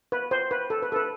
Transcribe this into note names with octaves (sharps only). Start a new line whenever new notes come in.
B4
C5
B4
A4
B4
A4
B4